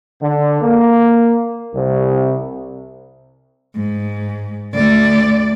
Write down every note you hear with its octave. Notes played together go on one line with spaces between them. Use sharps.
D3
A#3
C2
G#2
D2 D5